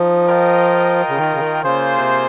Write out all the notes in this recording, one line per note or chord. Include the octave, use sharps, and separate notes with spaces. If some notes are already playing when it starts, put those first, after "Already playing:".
Already playing: F3 D#4
F4 A#4 D#5 G5
C#3
D#3
C#3
D#3
C#3 A#3 F4 G#4 C5
C3